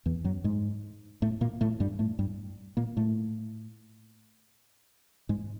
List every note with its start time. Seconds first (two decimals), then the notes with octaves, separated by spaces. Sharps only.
0.06 E2 E3
0.24 F#2 F#3
0.44 G#2 G#3
1.22 A2 A3
1.41 A#2 A#3
1.61 A2 A3
1.80 G2 G3
1.99 A2 A3
2.19 G2 G3
2.77 A#2 A#3
2.97 A2 A3
5.29 G#2 G#3